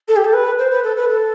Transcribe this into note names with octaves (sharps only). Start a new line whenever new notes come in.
A4
G4
A4
B4
C5
B4
A4
B4
A4